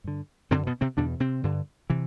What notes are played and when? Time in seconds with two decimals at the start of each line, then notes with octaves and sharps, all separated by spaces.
0.04 G2 D3
0.51 F#2 C3 C4
0.54 D3
0.67 B2 B3
0.81 C3 C4
0.97 E2 B2 D3 D4
1.20 C3 C4
1.44 G2 D3
1.90 C3 E3